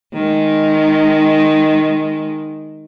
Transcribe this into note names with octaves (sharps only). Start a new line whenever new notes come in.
D#3 G#3